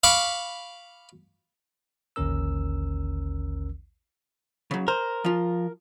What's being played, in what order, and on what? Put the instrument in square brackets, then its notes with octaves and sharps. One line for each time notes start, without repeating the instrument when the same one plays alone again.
[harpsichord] F5 B5 C#6 D6
[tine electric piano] A1 D#2 D3 C#4 A#4 E6
[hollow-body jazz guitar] C#3 F#3
[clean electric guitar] A#4 [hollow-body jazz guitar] C5
[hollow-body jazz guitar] F3 F4